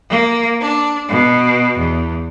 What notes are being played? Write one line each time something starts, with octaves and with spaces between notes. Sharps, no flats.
A#3
D4
B2
E2